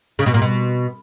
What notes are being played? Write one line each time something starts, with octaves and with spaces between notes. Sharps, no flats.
C#3
B2
A#2
B2